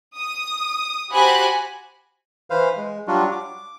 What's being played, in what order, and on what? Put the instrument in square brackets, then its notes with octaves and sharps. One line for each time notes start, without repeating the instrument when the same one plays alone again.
[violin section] D#6
F#4 G4 C5 G#5 B5 F#6
[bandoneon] E3 B4 C5 F5
G#3
F#3 G3 D4 F4 F#4
D6